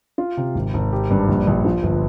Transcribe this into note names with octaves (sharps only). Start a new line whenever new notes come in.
F4
C3
G#1
G#1
G4
G2
A#1
A#1
F3
G1